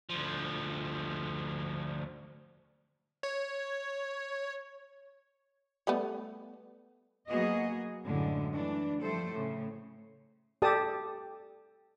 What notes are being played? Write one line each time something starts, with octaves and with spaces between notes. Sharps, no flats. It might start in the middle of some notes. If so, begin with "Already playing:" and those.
D2 F3
C#5
G3 A3 B3
F#3 A#3 B3 F#4 G#4 D#5
F#2 A2 D3 G#3
E3 A3 D4
F3 G3 A3 A4 C5
A2 C#3
G4 A4 D5 A5 D#6